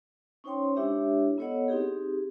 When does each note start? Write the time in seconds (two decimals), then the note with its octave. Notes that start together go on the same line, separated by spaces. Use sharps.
0.44 C#4 D#4 C5 C#5 G5 C6
0.76 G#3 D4 E4 G4 C#5 E5
1.38 B3 E4 A4 C#5 D#5 F#5
1.68 C4 D#4 G4 G#4